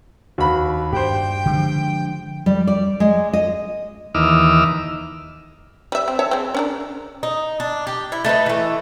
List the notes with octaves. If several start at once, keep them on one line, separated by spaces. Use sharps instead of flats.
D#2 F#4 B5
G2 G4 C5 G5
D3 F3 G#3
G3
D5
G#3
D#5
D#2 E3 D#5 D6 E6 F6
G3 E5
C4
C#5 E5 A5
C4 G#4
C#4 D4 A#4
D#4
D4
G4
E4
A3 D#4 A#4 B4
E3 A3